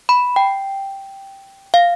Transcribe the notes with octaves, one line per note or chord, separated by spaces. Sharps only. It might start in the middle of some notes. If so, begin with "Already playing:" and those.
B5
G5
F5